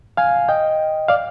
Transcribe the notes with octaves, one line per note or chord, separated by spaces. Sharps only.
F5 G#5
D#5 G5
D5 F5